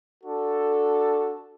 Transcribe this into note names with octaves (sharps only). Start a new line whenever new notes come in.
D4 F#4 A4